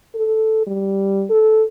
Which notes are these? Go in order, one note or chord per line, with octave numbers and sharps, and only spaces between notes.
A4
G3
A4